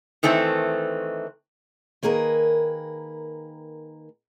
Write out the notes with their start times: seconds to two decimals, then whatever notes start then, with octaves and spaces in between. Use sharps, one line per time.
0.23 D#3 E3 A3 C4
2.03 D#3 A#3 G#4 A#4 B4